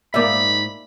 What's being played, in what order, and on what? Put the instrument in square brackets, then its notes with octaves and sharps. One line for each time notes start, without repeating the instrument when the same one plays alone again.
[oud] G#2 D#4 [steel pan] A#3 D5 E5 [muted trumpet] B5